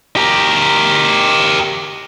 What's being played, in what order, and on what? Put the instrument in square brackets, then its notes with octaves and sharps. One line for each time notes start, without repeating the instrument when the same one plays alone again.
[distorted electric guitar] G4 A#4